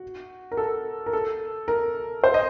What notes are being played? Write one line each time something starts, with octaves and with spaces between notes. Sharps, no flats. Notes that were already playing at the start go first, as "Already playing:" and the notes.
Already playing: F#4
A#4
A4
A#4
A4
A#4
C5
D#5